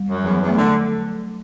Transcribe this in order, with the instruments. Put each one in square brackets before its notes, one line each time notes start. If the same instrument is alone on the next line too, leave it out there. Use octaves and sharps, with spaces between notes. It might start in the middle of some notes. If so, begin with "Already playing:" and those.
Already playing: [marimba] G3
[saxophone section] F#2
[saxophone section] E2 [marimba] F#3
[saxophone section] E2
[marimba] A3
[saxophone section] D3